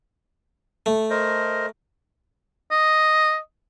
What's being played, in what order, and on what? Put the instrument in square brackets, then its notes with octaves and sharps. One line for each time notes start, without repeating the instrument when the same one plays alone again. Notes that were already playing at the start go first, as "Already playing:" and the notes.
[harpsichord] A3
[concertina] A#4 C5 D#5
[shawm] D#5